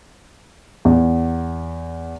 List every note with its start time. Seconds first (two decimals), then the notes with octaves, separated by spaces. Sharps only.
0.85 E2